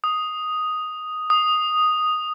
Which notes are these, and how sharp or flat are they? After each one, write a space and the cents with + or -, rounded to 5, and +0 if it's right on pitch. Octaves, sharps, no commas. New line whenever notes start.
D#6 +0
D#6 -5